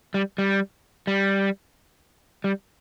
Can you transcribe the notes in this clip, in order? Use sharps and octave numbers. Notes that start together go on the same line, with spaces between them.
G3
G3
G3
G3